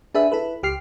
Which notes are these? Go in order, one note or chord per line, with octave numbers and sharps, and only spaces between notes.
D4 G#4 B4 E5
E4 A4 B4
C#2 G4 F6 C7